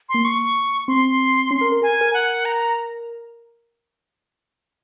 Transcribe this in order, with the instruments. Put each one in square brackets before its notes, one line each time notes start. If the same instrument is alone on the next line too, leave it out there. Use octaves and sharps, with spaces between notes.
[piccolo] C6
[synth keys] A#3
[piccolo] C#6
[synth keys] C4 [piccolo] C6
[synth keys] C#4
A#4
A#4
[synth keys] A#4 [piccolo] G#5
[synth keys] A#4
[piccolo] F#5
A#5